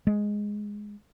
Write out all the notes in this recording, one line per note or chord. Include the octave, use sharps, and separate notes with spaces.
G#3